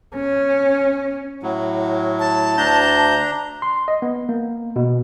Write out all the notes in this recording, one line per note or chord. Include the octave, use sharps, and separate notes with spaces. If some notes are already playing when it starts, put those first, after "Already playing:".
C#4
A2 F#3
A5
D2 D4 A#5 G6
C6
D#5
B3
A#3
B2